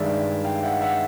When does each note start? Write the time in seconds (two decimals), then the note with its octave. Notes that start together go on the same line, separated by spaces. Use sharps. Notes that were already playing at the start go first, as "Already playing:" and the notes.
Already playing: G2 D#3 G#3 D5 E5
0.44 F5 G5
0.63 E5 F#5
0.81 E5 F#5